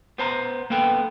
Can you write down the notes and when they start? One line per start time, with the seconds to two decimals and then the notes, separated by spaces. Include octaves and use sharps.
0.18 B3 C5 A5 A#5
0.70 A#3 B3 A4 G5